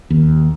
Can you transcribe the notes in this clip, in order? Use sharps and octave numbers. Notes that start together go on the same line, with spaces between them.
D#2